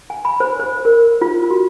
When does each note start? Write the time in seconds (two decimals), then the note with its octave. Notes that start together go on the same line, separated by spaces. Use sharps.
0.10 G#5
0.25 B5
0.40 C5
0.60 C5
0.85 A#4
1.21 F4
1.51 F#4